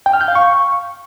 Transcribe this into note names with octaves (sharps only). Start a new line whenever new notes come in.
G5
F6
G6
F5
C#6